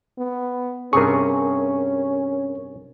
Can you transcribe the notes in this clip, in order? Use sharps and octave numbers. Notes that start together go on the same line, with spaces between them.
B3
G2 C3 C#4 G#4 A#4 C#6